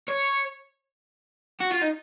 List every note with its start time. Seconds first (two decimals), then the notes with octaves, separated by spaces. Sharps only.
0.08 C#5
1.61 F#4
1.71 F4
1.82 D#4